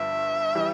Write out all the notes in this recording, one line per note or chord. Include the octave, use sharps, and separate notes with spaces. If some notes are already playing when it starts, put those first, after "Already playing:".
Already playing: G1 G2 F3 E5
E3 G3